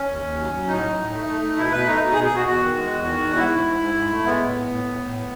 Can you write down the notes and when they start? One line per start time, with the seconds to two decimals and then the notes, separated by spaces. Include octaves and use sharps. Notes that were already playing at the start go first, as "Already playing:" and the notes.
Already playing: C#4
0.08 D#2
0.23 D#2
0.38 F#3
0.53 F#3
0.67 A2 D#4
0.83 F#3
0.97 A2
1.12 A3
1.27 A3
1.42 A3
1.57 B2 E4
1.72 B2 B4
1.86 A3 D#4
2.01 B2 D#4
2.13 G#4
2.16 B2
2.24 G#4
2.32 B2 F#4
2.46 E2 F#4
2.61 D#3
2.76 G#3
2.91 E2
3.05 D#3
3.21 E2
3.36 G#2 E4
3.50 G#2
3.65 G#2
3.81 G#2
3.95 G#2
4.10 A3
4.25 G#3 B3
4.40 A2
4.55 A2
4.70 A2
4.84 A2
5.00 A2